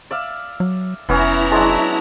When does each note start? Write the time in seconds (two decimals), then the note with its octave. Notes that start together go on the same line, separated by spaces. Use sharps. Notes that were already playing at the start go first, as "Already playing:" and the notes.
0.11 D5 E5 F5
0.60 F#3
1.09 F1 E3 B3 C#4 E4 A#5
1.52 F#3 G#3 D4 G#4 A5